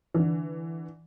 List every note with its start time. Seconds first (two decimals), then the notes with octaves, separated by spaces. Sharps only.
0.14 D3 E3